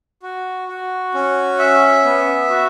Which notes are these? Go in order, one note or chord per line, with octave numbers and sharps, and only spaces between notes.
F#4
F#4
C#4
E5
B3
F#4